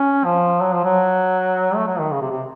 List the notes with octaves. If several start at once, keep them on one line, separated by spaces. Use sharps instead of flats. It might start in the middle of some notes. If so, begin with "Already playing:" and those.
Already playing: C#4
F3
F#3
F3
F#3
A3
F#3
D#3
C#3
C3
C3